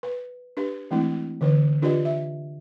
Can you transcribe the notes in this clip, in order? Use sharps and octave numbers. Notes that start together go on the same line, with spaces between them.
B4
D4 G4 B4
E3 G#3 A3 C4 D4 E4
D3 E3 B4
D4 F4 G4 B4 D5 D#5
E5